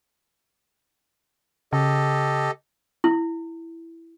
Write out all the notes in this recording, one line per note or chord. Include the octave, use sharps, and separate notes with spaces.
C#3 G4 A4 D#5
E4